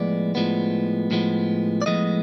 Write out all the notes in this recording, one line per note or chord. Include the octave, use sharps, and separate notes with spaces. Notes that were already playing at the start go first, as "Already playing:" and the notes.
Already playing: A2 F3 G#3 B3 D5
A2 F3 G#3 B3
A2 F3 G#3 B3
D5
A2 F3 G#3 B3 D#5